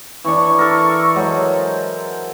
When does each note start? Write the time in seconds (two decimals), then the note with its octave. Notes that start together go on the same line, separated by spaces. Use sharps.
0.25 E3 D4 C#6
0.59 A4 A#4
1.16 F#3 G#3 C5